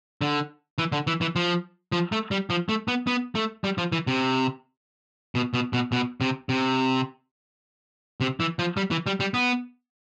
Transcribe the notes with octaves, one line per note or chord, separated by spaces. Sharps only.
D3
E3
D3
E3
E3
F3
F3
A3
G3
F3
A3
B3
B3
A3
G3
F3
E3
C3
B2
B2
B2
B2
C3
C3
C3
E3
F3
G3
E3
G3
G3
B3